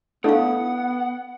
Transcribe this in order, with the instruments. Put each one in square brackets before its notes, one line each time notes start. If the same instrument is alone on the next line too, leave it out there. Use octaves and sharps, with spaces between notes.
[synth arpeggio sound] A3 D4 E4 [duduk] B3 [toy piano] A4 F5 [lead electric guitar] F#5